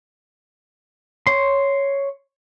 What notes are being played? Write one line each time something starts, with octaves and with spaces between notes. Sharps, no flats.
C#5 C6